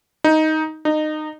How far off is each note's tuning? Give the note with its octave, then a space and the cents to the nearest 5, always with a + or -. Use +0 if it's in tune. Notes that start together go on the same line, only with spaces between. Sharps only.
D#4 +10
D#4 -20